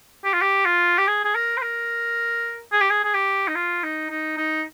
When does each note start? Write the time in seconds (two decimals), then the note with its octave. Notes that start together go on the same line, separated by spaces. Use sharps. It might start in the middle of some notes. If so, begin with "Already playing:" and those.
0.25 G4
0.33 F4
0.42 G4
0.65 F4
0.98 G4
1.07 G#4
1.25 G#4
1.35 A#4
1.58 C5
1.62 A#4
2.72 G#4
2.81 G4
2.90 G#4
3.04 G#4
3.14 G4
3.48 D#4
3.55 F4
3.83 D#4
4.10 D#4
4.38 D#4